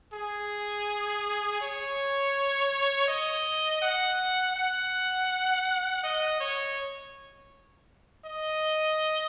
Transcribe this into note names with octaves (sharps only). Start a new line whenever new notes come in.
G#4
C#5
D#5
F#5
F#5
D#5
C#5
D#5